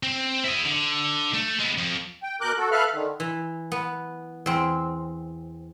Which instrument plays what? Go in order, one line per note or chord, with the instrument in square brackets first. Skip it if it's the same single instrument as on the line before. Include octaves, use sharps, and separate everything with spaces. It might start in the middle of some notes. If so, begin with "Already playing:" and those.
[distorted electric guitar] C4
E4 G#4
D3
A3
G#3 B3
F2
[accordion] G5
B2 A#4 D6 F#6 G6
F#4 A4
A4 B4 E5 F5 F6 F#6
D3 D#3
[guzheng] E3
B3
E2 C4